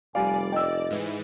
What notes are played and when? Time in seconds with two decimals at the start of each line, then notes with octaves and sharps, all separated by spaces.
0.15 F1 G3 D5 F5 G#5
0.52 D#5 G5 E6
0.91 G#2 E3